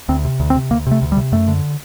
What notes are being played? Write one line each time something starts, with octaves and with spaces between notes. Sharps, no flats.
D2 C4
C3
D2
C4
C3
D2 A#3
C3 A3
D2
G3
C3
F#2 A3
D3